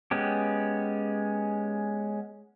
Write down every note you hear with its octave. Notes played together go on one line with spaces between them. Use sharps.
G#3 B3 C#4 G4